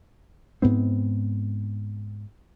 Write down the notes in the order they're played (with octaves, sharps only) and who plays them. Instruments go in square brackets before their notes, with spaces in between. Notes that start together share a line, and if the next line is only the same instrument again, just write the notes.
[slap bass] G#2 B3 C4